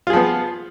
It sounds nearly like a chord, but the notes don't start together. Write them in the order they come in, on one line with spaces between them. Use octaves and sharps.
F4 G#4 F3 B3